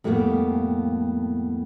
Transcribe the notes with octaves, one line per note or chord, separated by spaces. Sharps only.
F2 A2 G3 G#3 A#3 B3